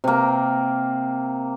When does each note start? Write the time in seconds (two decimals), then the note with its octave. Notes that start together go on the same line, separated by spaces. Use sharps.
0.04 C3 A#3